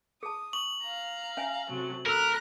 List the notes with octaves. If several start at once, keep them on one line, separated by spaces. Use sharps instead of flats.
G#4 A5 D#6
C#6 F#7
F5 A#5
C#4 E5 G#5
C3 F#3 A3
A3 A4 A#4 A#5 B5 E6 F#6